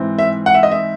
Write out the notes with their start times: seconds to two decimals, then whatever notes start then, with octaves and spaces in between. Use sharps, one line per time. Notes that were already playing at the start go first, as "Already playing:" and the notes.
Already playing: G#2 E3 C4
0.19 E5
0.46 F#5
0.54 E5
0.63 D#5
0.71 E5